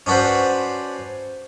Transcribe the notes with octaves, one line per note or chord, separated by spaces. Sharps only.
C#4 D4 F#4 B4 C5